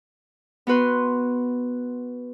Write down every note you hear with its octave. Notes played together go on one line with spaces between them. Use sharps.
B3 F#4 B4 C6